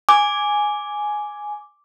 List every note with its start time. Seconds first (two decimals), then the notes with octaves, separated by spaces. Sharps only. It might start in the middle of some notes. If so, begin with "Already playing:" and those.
0.09 G#5 D6